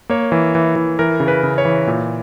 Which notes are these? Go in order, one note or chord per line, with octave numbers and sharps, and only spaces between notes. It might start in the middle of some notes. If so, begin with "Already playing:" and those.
A#3 C#5
E3
E3
E3
E3 A#4
C#3
B4
C#3
C#5
E3
A#2